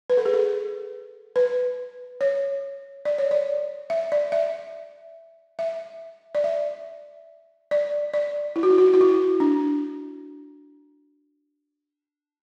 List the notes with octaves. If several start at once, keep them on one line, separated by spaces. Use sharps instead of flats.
B4
A4
G#4
A4
B4
C#5
D5
C#5
D5
E5
D5
E5
E5
D5
E5
D5
D5
E4
F#4
E4
F#4
E4
F#4
E4
D4